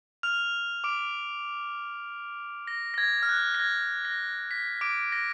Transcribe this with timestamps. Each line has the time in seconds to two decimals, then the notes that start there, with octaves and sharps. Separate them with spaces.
0.23 F6 F7
0.84 D6 D7
2.67 A#6
2.94 A#6
2.98 G#6
3.23 F6
3.29 F#6
3.55 A#6
3.60 G#6
4.05 A#6
4.51 B6
4.81 D6 D7
5.12 A#6